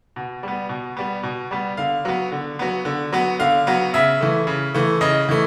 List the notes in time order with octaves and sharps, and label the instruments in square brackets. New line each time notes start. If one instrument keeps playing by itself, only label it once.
[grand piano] B2
G3 B3
B2
G3 B3
B2
G3 B3
D3 F5
F#3 B3
D3
F#3 B3
D3
F#3 B3
D3 F5
F#3 B3
C#3 E5
E3 A3
C#3
E3 A3
C#3 D#5
E3 A3